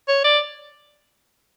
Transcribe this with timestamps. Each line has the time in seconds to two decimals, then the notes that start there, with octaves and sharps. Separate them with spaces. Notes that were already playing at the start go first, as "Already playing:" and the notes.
0.08 C#5
0.24 D5